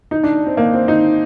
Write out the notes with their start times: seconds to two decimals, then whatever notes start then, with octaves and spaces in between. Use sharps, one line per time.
0.11 D#4
0.23 D4
0.46 C4
0.57 A#3
0.73 C4
0.88 D#4